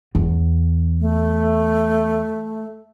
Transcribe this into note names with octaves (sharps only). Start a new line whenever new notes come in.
E2
A3